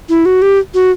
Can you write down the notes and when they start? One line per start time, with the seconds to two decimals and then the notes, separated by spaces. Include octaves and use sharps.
0.09 E4
0.26 F#4
0.42 G4
0.74 F#4